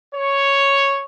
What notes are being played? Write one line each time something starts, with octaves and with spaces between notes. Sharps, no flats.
C#5